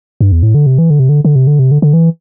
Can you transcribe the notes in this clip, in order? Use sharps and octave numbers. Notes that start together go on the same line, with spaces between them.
G2
E2
A2
D3
C3
E3
D3
C3
D3
D3
C3
D3
C3
D3
D3
E3